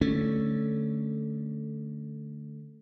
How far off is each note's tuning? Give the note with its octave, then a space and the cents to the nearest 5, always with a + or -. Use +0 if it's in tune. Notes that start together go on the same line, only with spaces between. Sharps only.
D3 +5 A3 +0 C#4 +0